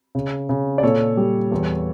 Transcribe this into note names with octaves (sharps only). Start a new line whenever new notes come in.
C#3
C#3
D5
A#2 A4 C#5
G3
E2